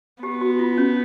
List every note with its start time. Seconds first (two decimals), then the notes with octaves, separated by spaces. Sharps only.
0.23 B3 G4
0.41 F#4
0.59 F4
0.78 C#4